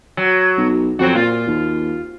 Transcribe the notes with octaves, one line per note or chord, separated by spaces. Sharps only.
F#3
B1
F2 F#3 C4 F#4
A#2 F4
D#2